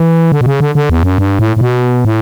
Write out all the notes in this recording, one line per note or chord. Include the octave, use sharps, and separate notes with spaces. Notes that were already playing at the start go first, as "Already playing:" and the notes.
Already playing: E3
D3
B2
C#3
D3
D3
E2
F#2
G2
A2
A2
B2
A2